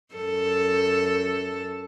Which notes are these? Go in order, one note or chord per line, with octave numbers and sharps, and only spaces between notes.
F#2 A4